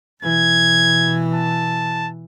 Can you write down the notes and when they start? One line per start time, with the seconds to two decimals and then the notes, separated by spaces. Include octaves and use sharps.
0.22 B2 E3 G#6
1.34 A5